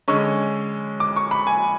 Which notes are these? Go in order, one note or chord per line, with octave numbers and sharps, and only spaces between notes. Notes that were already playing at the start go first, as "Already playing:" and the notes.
D3 G#3 C#4 C#6
D6
C#6
B5
G#5